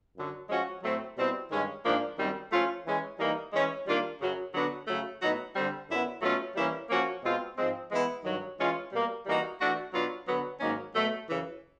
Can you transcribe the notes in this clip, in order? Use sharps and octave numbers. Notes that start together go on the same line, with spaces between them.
F#2 D3 F#3
F3 G#3 C#4 F#4
A2 F#3 A3 C4
B2 G3 C4 E4
G2 D#3 G#3 C#4
G#2 F3 A#3 D4
F#2 D#3 G3 C4
F3 A3 C#4 F4
E3 G#3 C#4
E3 G3 A#3 D#4
E3 G#3 C#4
D#3 G3 A#3 D4 F4
F#2 C#3 F#3
D3 F#3 B3 D4 F#4
C#3 F#3 A3
A2 F#3 B3 D#4 F#4
D3 G3 C4
F#2 D3 F#3 B3 E4
B2 F#3 A3 C#4 F4
E3 G3 A#3 C#4 E4
F3 A#3 C#4 F#4
B2 G#3 C4 F4
G#2 F3 G#3 C4
E3 G#3 B3 E4
G2 D#3 F#3
E3 G#3 C#4 F4
B2 G3 A#3
E3 G3 A#3 D#4 F#4
E3 A3 D4 F#4
B2 F#3 B3 D4 F4
D3 F#3 B3
G#2 D#3 F#3 A#3 C#4
B2 F#3 A3
F#2 C#3 E3